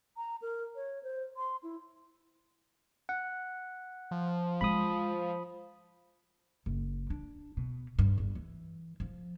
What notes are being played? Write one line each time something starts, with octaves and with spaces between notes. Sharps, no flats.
A#5
A#4
C#5
C5
C6
E4
F#5
F3
E3 G#3 B5 D#6
F#1
D4
B2
G2
G1
E3
F3